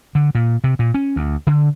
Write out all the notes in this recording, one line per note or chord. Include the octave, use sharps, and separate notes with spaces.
D3
A#2
C3
A#2
C#4
D2
D3